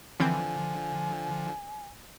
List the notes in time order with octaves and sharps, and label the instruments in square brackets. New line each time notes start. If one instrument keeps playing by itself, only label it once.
[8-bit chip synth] D3 F3 [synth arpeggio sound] E3 C4 G6 [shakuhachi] G#5